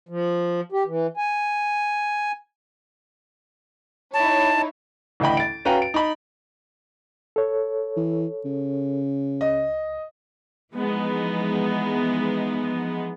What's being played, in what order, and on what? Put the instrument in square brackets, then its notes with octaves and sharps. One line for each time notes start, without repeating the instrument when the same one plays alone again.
[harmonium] F3
G4
E3
G#5
[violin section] D#4 E4 C#5 [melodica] A5
[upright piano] A1 D2 D#5 G5 B5
A6 D7
C#4 F#4 B4 F5 G5 A#5
D7
D#4 B5
[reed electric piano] A4 C#5
[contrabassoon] E3
C#3
[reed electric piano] C#2 [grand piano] D#5
[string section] E3 F3 G#3 B3 D#4